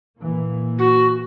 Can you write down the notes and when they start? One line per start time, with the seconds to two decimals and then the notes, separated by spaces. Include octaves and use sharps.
0.19 A#2 E3 A#3
0.79 F#4